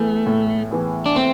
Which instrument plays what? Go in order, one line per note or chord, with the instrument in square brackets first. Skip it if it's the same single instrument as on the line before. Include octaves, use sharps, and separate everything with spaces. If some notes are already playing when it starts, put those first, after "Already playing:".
Already playing: [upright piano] A2 E3 B3 E4 G#4 [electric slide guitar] A3
[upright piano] A2
E3 B3 E4 G#4
[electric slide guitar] D4
[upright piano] A2 [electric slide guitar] C4